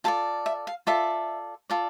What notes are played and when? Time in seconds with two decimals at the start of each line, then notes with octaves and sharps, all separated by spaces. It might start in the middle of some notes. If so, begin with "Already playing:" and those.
0.04 F4 A4 D5 A5
0.46 E5
0.67 F5
0.87 F4 A4 D5 E5
1.70 F4 A4 D5